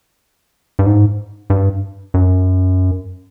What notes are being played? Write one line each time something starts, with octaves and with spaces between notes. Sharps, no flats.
G2
G#2
G2
F#2